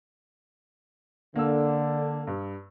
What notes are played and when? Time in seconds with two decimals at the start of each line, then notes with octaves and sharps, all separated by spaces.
1.36 D3 A#3 E6
2.27 G2